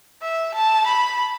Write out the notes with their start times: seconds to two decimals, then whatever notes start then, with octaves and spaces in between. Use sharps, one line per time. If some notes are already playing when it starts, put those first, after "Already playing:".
0.23 E5
0.55 A5
0.87 B5